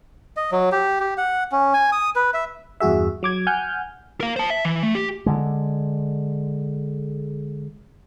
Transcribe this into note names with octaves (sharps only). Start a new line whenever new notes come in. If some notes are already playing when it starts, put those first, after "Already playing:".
D#5
F#3
G4
G4
F#5
C#4
G#5
D#6
B4
E5
E2 G2 F#4 G#4 E5
F#3 D6 G#6
F#5 G#5 F6 G6
A#4 F5
C5 A5
E5
E3
A3
G4
D3 G#3